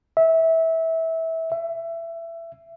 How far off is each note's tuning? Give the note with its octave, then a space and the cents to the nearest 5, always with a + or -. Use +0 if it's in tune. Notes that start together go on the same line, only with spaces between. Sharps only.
E5 -20
E5 +20